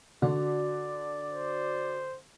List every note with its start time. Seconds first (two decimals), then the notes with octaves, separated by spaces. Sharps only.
0.22 D3 F#4 D5
1.31 C5